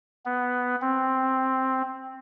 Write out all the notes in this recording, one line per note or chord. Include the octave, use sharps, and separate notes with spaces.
B3
C4